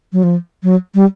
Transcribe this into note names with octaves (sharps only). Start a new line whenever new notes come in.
F#3
F3
F#3
G3